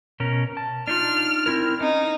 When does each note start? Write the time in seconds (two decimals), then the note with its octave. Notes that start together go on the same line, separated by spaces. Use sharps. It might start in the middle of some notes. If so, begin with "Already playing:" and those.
0.20 B2 C#4 A#4
0.57 A5
0.88 D4 D#4 F4 F6
1.46 C4 E4 A#4
1.81 C#4 D#4